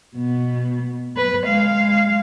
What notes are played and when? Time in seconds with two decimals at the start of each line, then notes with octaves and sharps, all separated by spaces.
0.16 B2 B3
1.17 B4
1.47 G#3 F5